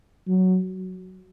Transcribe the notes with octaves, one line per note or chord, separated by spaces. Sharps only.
F#3